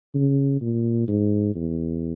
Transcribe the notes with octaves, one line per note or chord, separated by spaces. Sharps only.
C#3
A#2
G#2
E2